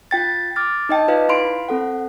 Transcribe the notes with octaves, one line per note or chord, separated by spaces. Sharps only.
F4 G5 A6
D6 F6 A6
D#4 D#5 G5 A5
D#4 F4 B4 D5 F5
E4 F5 B5 C6 D7
C4 A4 F#5